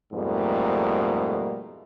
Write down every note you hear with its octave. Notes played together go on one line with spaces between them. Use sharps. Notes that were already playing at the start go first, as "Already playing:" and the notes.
F2 G#2 B2 G3 A3 A#3